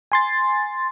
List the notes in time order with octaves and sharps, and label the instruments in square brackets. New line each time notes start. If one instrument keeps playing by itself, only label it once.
[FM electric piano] G#5 C6 A6